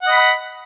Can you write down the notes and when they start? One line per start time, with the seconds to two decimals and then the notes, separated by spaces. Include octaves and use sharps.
0.03 F#5
0.07 D#5
0.11 B5